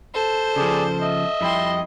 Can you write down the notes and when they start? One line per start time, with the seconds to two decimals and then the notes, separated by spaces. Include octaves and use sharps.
0.14 A4 C5
0.56 C#3 F3 G#4 D5
1.02 D#5 E5
1.41 F2 G3 E4 G5 C6